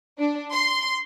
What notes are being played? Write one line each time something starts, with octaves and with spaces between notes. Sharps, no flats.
D4
C6